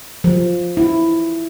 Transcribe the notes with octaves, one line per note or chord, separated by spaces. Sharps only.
F3
E4